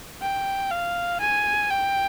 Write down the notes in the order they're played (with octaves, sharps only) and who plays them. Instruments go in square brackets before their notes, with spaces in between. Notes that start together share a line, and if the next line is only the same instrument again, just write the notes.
[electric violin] G5
F5
G#5
G5